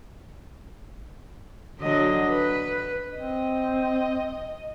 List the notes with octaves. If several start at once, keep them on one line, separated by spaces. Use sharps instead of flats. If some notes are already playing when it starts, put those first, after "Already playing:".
D3 F#3 D#5
B4
C4 D#5